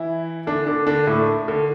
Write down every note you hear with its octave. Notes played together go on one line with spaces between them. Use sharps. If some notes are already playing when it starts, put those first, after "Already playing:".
Already playing: E3 E4
D3 D4
D3 D4
D3 D4
A2 A3
D3